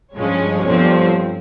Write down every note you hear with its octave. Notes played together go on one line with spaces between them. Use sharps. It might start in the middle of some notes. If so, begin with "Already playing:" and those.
G2 F3 G#3 C#4 C#5
G1 G2 F3 C4